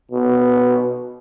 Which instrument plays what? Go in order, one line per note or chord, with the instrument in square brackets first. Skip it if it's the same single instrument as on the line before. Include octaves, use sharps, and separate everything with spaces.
[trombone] B2